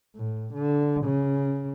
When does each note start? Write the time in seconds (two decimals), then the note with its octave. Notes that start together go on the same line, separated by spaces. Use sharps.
0.16 A2
0.54 D3
1.04 C#3